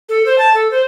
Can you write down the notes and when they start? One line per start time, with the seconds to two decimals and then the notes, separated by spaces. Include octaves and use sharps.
0.09 A4
0.26 C5
0.38 A5
0.54 A4
0.71 C5